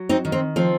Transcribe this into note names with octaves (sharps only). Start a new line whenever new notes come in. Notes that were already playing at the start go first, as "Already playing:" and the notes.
Already playing: F#3
C4 D#4
D#3
C4
F3 C4